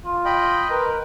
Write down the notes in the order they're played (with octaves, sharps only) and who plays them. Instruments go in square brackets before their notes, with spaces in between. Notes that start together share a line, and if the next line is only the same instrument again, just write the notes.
[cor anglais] F4
[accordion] D#5 G5 B5
[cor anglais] A#4 [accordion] B4